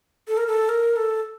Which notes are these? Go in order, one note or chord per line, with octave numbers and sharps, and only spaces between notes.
A4
A#4
A4
A#4
A4